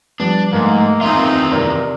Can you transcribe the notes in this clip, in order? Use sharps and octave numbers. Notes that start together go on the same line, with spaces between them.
F3 G3 B3 D4
G#2 A3 A#3
E2 D#3 C4 D#4 F4 E5
C3 A#4 D5